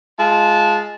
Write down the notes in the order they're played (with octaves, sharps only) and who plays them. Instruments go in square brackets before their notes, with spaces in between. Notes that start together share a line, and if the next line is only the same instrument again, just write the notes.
[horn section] G#3 F4 A5